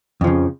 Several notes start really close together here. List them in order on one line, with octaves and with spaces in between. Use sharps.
F2 F3 C#3